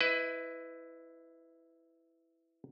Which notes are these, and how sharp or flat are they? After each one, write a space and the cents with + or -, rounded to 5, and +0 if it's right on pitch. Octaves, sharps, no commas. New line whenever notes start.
E4 +0 B4 +20 D#5 +20